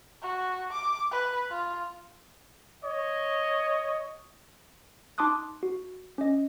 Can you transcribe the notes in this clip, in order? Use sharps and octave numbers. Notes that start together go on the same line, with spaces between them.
F#4
D6
B4
F4
C#5 D#5
D#4 A5 C6 D6 D#6 F#6
F#4
C#4 D#5